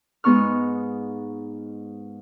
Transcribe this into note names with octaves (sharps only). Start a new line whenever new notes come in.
G#2 G#3 B3 D#4 C#6 F6